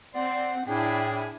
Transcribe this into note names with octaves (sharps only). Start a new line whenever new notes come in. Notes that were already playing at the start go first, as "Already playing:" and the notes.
C4 D5 F#5 C6
A2 D4 E4 G#4 G5